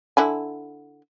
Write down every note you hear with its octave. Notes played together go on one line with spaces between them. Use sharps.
D3 E4 G#5